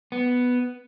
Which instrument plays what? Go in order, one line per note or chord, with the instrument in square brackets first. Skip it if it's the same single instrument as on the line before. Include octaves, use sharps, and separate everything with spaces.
[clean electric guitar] B3